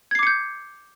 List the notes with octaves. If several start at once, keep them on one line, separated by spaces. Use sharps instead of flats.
D6 G6 G#6 C7 C#7